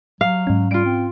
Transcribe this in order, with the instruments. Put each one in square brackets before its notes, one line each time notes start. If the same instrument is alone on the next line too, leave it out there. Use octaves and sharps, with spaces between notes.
[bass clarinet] F#3 [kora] F5
[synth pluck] G#2 C#4
[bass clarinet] G3 [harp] F4 D7
[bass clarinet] C4